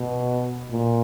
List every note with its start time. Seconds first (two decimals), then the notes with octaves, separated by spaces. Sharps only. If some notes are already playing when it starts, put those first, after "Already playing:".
Already playing: B2
0.71 A#2